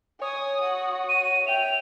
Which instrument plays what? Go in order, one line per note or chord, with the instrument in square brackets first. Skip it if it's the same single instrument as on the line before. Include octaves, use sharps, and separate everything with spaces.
[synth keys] C#5 [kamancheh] G#5 [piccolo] D#6
[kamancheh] F#4
[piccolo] D#7
[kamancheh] E5 G5 [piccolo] F7